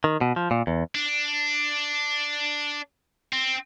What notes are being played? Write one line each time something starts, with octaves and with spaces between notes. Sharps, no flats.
D#3
B2
F3
A#2
E2
D4
C4